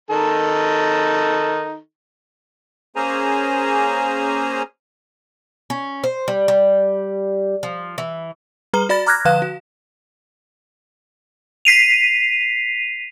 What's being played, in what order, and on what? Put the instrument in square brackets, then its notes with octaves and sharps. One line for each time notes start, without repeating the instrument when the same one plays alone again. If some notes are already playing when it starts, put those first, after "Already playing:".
[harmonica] D#3 D#4 A4
[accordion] A#3 C#4 G#4 C5 G#5 A#5
[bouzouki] C#4
C5
G3
G3
F3
E3
[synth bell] G3 G#4 B4 A#5 G7
F#4 D5 B5 A6
A#5 D6 F6 F#6 G#6 A#6
D3 F3 B4 F5 F#6 E7
F#4
B6 C7 D#7 F7